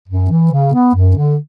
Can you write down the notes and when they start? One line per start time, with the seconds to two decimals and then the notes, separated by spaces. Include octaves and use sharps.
0.09 F#2
0.30 E3
0.52 C#3
0.73 B3
0.95 F#2
1.16 D3